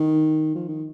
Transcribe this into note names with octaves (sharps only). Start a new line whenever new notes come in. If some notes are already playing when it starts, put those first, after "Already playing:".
Already playing: D#3
F3
D#3